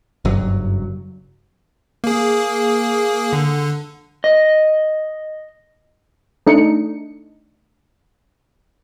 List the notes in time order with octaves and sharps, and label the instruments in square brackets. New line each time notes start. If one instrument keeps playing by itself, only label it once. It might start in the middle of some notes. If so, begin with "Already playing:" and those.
[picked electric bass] F#1 G2 F#3
[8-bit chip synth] A#3 G#4
D3
[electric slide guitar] D#5
[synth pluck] A3 D4 D#4 C#7